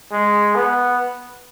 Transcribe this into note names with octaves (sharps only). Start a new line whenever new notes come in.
G#3
B3